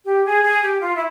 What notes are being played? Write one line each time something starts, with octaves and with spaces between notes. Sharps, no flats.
G4
G#4
G#4
G4
F4
E4